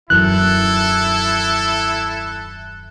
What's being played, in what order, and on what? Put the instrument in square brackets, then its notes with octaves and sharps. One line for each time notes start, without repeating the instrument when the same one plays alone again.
[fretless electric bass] D#1 F#2 E3 [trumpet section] E4 A4 [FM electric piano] F#6